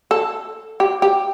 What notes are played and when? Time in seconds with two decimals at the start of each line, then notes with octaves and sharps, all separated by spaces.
0.11 A4
0.80 G4
1.02 G4